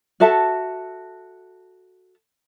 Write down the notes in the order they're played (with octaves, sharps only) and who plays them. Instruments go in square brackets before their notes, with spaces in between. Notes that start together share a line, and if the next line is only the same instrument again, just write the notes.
[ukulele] F#4 A4 E5 A5